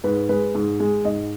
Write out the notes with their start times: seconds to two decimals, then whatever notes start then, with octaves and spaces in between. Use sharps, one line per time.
0.04 G#2 B4
0.29 G#3 B4
0.55 G#2
0.80 G#3
1.05 G#2 D#5